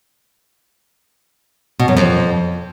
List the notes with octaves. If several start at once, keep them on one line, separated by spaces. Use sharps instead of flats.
B2
F#2
F2